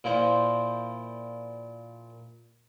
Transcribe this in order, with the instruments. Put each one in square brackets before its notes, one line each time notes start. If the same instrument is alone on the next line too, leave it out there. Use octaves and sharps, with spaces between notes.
[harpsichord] A#2 F3 E4 C5